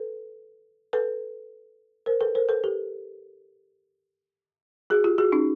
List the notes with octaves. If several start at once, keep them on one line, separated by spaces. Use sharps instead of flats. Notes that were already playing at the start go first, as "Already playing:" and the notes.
Already playing: A4 B4
A4 B4
A#4 C5
A4 B4
A#4 C5
A4 B4
G4 A4
F#4 G#4
F4 G4
F#4 G#4
C#4 D#4